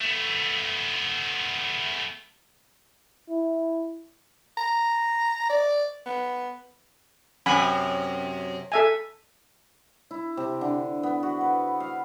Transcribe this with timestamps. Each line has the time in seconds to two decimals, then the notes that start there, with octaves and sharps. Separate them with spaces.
0.01 A3 B3
3.29 E4
4.57 A#5
5.49 D5
6.06 B3
7.46 F#2 C3 F#5 G#5 B5
8.72 A4 E5 G#5
10.11 E4
10.37 C3
10.61 D3
11.03 B3
11.23 F#4
11.41 B4
11.80 F5